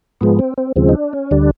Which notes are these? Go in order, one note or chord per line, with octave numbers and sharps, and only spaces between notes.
G#2 F3 G#3 B3
C4
C4
D#2 C#3 F3 G#3 C4
D#4
D4
C#4
D2 D3 G3 D4